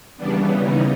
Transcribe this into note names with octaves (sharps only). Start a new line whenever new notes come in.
D#2 C#3 E3 G3 B3 D4
D#4